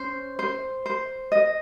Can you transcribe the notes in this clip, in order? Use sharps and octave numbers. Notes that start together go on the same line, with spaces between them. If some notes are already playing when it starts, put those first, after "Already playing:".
Already playing: C#4 C5
C5
C5
D#5